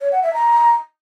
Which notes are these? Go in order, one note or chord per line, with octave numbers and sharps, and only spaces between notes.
C#5
F#5
E5
A#5